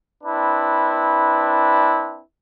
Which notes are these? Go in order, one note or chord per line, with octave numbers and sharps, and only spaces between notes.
C4 D4 E4 B4